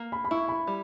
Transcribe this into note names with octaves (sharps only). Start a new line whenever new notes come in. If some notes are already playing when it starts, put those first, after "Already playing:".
Already playing: A#3
B5
B5
E4 C#6
B5
G3